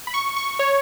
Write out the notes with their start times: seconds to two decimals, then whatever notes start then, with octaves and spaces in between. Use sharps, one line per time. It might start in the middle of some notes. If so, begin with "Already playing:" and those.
0.07 B5
0.14 C#6
0.37 C#6
0.59 C#5